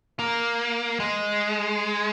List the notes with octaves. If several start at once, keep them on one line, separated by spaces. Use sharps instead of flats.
A#3
G#3